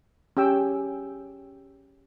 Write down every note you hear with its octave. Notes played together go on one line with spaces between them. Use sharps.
C#4 G4 G5 E6